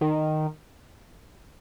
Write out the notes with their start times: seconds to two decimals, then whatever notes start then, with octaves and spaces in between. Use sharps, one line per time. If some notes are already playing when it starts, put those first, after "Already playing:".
0.01 D#3